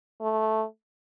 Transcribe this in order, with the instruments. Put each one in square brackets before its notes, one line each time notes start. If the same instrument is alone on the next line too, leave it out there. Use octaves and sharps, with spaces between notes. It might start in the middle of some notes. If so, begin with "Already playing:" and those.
[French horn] A3